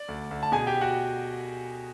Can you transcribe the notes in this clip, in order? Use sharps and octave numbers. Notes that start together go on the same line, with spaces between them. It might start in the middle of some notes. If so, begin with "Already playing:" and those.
Already playing: D5
D2
D2
A5
B2 G#4 G#5
G4 G5
B2
F#4 F#5